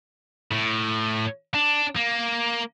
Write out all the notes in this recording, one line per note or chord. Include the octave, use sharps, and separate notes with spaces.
A2
D4
A#3